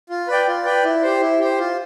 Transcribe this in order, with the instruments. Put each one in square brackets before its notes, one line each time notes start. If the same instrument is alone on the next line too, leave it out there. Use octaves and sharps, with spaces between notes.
[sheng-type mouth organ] F4
B4 D5 G5
F4
B4 D5 G5
E4
G4 C5
E4
G4 C5
F4